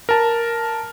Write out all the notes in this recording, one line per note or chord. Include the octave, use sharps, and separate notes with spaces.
A#4 A5